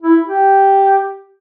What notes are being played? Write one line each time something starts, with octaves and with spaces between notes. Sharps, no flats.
E4
G4